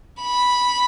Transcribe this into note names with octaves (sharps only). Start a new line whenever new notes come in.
B5